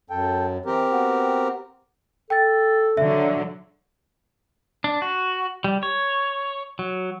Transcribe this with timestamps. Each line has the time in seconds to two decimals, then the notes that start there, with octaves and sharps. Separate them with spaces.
0.10 F#2 A4 G5
0.66 E3 C4 G4 A#4
0.92 B3 F#4
2.30 A4 G5 A6
2.97 D3 F#3 E5
4.84 D4
5.02 F#4
5.64 G3
5.83 C#5
6.79 F#3